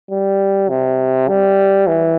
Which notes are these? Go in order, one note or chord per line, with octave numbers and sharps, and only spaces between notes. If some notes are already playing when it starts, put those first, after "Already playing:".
G3
C3
G3
E3